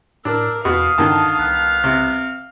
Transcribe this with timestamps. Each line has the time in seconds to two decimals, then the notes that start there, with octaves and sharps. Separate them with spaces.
0.25 A2 D4 A#4 E6
0.65 E2 B2 F5 D#6
0.98 G2 D3 D#3 A5
1.38 C2 B3
1.84 C3